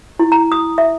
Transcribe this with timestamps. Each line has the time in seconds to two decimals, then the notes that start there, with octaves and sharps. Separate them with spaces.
0.19 E4
0.32 A#5
0.52 D#6
0.78 E5